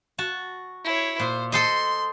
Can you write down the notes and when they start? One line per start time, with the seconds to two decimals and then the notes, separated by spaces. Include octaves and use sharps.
0.18 F#4 A5
0.84 E4 C#5
1.20 A#2 C5
1.52 A4 C5 D#5 C6